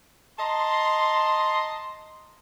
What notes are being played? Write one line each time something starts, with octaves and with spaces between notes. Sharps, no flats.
D#5 A5 A#5 C6